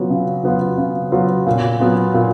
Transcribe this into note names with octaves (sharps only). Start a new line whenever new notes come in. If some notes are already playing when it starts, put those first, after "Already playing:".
Already playing: C#3 F#3 B3 F4
C#3
F#3 B3 F4
C#3
F#3 B3 F4
A#2
F#3 B3 F4
A#2